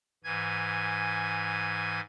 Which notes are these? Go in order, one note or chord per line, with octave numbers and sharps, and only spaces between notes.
G#2 E3 G#5 G#6